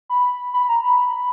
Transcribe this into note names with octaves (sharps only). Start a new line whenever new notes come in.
B5
B5
A#5
B5